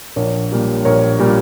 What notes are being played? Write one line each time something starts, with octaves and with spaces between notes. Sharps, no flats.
A#1 A#4 C#5
A#2 G3 A#3
A#1 A#4 C#5
A#2 G3 A#3